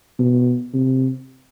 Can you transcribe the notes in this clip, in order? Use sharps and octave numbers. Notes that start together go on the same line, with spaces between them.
B2
C3